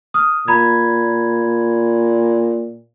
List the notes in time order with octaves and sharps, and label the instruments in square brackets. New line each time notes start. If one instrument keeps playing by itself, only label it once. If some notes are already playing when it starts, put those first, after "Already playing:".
[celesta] D#6 F6
[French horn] A#2 [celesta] A#5 B5 G#6